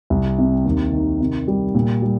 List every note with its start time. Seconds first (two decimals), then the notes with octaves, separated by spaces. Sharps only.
0.10 C2
0.39 C3
0.65 D#2
0.92 D#3
1.20 C3
1.48 G3
1.75 A#2
2.02 G3